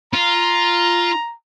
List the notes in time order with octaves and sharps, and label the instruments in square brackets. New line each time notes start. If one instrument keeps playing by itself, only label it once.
[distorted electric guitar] F4 [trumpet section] A#5